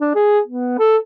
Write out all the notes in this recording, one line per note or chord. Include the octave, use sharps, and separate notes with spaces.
D4
G#4
B3
A4